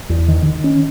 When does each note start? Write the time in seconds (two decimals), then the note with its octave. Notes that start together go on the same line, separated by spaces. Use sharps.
0.09 E2
0.28 D#3
0.46 D#3
0.64 C#4